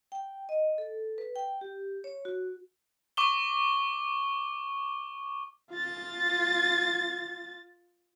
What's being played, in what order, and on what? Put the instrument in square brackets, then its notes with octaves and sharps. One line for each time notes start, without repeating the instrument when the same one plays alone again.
[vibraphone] G5
D#5
A4
B4
G5
G4
C#5
F#4
[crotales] C#6 D6 G7
[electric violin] F4 A6